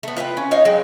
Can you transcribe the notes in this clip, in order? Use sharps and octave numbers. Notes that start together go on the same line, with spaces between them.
A3 B3
F4 B4 E5 G5
C#4
D#4 C#5 D#5 F5
F#3 G#3 G5